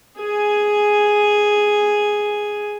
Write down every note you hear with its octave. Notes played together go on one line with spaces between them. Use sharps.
G#4 G#5